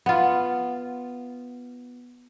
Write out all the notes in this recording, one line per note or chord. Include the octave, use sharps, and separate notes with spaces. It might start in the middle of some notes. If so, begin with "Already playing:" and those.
B3 F4